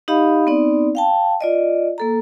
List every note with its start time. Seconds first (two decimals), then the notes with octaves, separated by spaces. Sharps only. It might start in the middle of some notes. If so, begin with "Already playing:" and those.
0.08 D#4 G4 D#5 F5 B5 D#6
0.47 B3 C4 D#4 D5
0.95 F5 G5 A5
1.41 F4 D5 D#5
1.98 A#3 A4 A#5